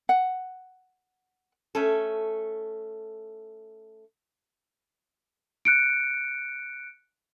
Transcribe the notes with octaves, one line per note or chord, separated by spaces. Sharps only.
F#5
A3 C#4 A4
F#6 C#7 D7